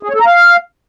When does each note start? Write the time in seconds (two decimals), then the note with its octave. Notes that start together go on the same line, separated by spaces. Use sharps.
0.03 G#4
0.09 C#5
0.14 A4
0.20 A#5
0.26 F5